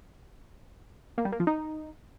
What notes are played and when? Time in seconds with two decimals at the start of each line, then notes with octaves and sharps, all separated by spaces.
1.18 A#3
1.25 G3
1.32 A#3
1.40 F3
1.47 D#4